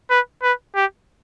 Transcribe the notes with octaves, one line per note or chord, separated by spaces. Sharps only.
B4
B4
G4